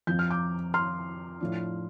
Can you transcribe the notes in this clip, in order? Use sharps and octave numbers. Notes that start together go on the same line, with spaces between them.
F2 F3 C4 G6
F6
D6 G6
C6 F6
A2 F3 D4